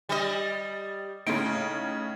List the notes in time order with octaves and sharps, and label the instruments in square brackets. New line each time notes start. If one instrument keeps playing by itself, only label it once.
[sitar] G3 D#5
[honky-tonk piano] A2 C#3 [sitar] D#4 [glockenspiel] D7